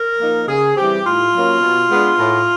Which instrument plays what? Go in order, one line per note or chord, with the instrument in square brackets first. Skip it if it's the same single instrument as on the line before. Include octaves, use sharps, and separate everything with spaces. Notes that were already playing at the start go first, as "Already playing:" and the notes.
Already playing: [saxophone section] A#4
F3 A#3 D#4
C#3 G#4
E3 G3 C4 G4
A2 F4
F#3 A#3 C#4
B2
G#3 B3 D4
A2